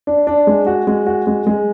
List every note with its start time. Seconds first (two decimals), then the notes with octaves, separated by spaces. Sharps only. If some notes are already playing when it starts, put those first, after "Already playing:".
0.07 D4
0.27 D4
0.47 G#3
0.67 F#4
0.87 G#3
1.07 F#4
1.27 G#3
1.47 G#3